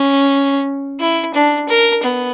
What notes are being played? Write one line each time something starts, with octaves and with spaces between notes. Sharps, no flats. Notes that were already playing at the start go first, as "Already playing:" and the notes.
Already playing: C#4
E4
D4
A#4
B3